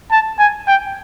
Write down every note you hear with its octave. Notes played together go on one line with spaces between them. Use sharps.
A5
G#5
G5